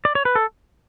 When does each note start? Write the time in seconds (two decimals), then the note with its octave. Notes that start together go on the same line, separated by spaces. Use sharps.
0.05 D5
0.15 C#5
0.25 B4
0.35 A4